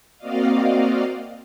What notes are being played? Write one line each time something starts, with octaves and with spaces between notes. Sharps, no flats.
A#3 C4 F#4 D5 D#5 F5